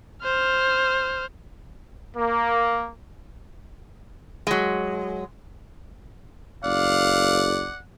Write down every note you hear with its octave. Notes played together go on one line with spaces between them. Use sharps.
C5 F6
A#3
F#3 G#3
F#1 D5 F5 F#5